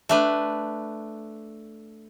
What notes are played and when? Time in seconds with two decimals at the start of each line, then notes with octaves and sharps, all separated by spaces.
0.09 A3 D4 B4